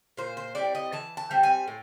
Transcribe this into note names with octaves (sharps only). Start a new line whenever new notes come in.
A#2 C5
C5
G3 C4 E4 D5
D#5
E3 A5
A5
G3 C4
G#5
A2